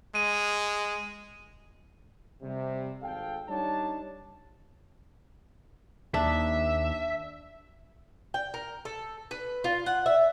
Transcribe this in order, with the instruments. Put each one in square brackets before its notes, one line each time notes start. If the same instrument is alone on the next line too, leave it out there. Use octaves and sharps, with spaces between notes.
[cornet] G#3 [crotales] D#7
[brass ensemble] C3 G3
G#1 A4 F5 G5
G3 D4 D#4 C#5 A5
[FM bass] D#2 [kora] D4 [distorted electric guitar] E5
[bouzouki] G5
A#4
A4
B4
F4
F#5
E5